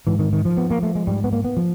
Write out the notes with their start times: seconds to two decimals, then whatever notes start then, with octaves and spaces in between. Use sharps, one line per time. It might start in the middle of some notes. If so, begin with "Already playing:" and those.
0.07 G#2 E3
0.19 D#3
0.33 D#3
0.45 F3
0.57 B3
0.70 A#3
0.83 A3
0.95 G#3
1.07 G#2 G3
1.24 B3
1.33 A#3
1.44 B3
1.57 F3